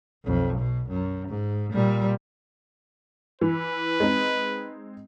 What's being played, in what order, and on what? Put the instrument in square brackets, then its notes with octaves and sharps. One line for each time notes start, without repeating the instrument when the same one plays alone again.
[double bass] B1 F2
B2
F#2
G#2
A#2 G3
[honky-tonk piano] E3 [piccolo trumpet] B4
[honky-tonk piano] G#3 C4 D#4